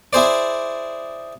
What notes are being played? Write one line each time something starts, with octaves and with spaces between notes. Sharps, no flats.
E4 G#4 C5 D5